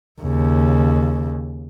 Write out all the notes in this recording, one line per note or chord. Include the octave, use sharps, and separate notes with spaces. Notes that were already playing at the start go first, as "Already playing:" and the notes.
D#2 C#3